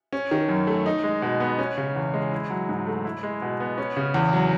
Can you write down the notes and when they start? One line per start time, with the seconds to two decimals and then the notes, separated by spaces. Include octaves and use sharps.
0.13 C#4
0.31 D#3
0.49 F#2
0.67 A3
0.86 D#4
1.04 G#3
1.22 B2
1.40 B3
1.59 C#4
1.77 C#3
1.96 E2
2.14 G#3
2.32 E4
2.50 F#3
2.69 G#2
2.87 A3
3.05 E4
3.23 G#3
3.42 B2
3.60 B3
3.78 C#4
3.97 C#3
4.14 E2
4.33 F#3